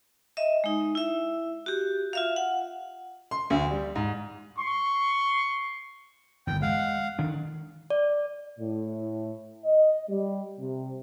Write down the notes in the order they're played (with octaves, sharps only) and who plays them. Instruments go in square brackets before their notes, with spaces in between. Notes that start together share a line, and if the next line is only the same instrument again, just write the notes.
[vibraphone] D#5 E5
G#3 D#4
E4 E5
F#4 G4
F4 E5 F5
F#5
[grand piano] C6
D2
G3
G#2
[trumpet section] C6 C#6
[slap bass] G1 E2 [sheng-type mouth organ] G5
[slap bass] G#3 [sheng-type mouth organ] F5 F#5
[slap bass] D#3 D4
[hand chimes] D5
[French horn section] A2
D#5
G3
C3